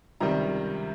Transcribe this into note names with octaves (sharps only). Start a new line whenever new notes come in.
C#2 C3 D#3 G3 A#5